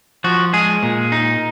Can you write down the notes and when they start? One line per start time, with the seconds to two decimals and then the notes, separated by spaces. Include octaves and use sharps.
0.24 F3 F#4
0.53 G#3 G#4
0.83 A#2
1.12 D#4